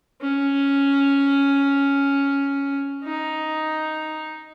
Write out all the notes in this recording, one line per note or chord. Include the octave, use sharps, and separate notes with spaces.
C#4
D#4